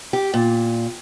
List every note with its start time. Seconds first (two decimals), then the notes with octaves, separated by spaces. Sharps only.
0.13 G4
0.34 A#2